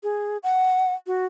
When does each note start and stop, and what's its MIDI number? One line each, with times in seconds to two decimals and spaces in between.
0.03 0.37 68
0.43 0.94 78
1.07 1.25 66